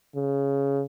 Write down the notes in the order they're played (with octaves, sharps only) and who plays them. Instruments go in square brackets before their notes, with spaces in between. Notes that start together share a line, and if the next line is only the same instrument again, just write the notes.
[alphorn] C#3